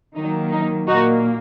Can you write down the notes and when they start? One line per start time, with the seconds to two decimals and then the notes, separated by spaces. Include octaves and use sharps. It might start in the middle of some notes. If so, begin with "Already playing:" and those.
0.16 D#3 F#3 A#3 D#4
0.52 D#4
0.88 A#2 A#3 D#4 F#4